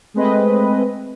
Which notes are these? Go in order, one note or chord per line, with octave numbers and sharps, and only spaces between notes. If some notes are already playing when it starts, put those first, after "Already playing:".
G#3 A3 C4 B4 D#5